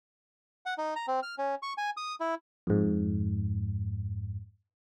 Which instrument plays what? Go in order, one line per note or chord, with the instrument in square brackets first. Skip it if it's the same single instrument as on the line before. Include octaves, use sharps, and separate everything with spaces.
[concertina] F#5
D#4
A#5
C4
F6
C#4
C#6
G#5
D#6
E4
[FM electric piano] F2 G#2